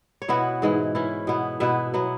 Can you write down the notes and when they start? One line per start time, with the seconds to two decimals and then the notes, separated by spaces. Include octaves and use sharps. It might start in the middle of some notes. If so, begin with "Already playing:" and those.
0.22 C#5
0.28 B2 B3 E4 F#4 B4
0.62 G#2 E3 G#3 E4
0.95 E3 C#4 E4
1.27 B2 B3 E4
1.60 B2 B3 E4 B4 E5
1.94 F#3 B3 E4